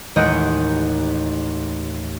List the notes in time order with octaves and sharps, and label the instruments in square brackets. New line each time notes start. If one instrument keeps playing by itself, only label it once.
[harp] A1 D#2 G#3 D#5 F#5 G6